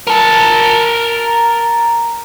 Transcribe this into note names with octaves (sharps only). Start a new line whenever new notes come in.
A#4 A5